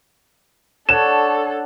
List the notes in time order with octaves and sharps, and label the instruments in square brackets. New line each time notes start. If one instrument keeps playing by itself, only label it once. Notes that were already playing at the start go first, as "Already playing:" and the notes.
[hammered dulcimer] D4 C#5 F#5 [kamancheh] A4 [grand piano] E7